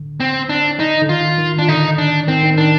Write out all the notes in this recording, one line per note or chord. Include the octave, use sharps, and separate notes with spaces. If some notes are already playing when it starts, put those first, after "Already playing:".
Already playing: D3
C4
D4
D#4
D3
D#3 F4
D#3
D4
D3 D#4
D4
D#3 C4
D#3
D#3 D4